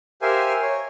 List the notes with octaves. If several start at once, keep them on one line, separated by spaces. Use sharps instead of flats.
G4 A#4 C5 E5 F5 G#5
C#5